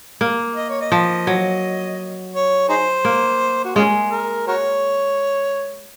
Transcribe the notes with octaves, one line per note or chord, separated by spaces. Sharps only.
A#3
D#5
C#5
D#5
F3
F#3
C#5
D#4 G#4 C5
A#3
F#4
G#3 C#4 F4 G#4
A#4
F#4 A#4 C#5